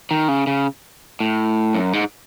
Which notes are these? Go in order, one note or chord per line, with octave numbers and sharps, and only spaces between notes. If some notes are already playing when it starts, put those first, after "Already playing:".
D#3
C#3
C#3
A2
F#2
G#2